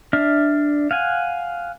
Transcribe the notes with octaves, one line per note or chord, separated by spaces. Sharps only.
D4 E5 F6
F5 F#5 G#5